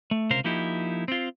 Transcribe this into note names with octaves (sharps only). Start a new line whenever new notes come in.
A3
C#2 C3 A#4 C5 F5
F3 A#3 D#4 E4 G4
C4 F4